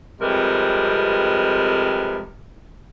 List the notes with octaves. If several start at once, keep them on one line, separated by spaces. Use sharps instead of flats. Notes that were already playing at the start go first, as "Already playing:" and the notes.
F2 C3 G3 G#3 A#4 B4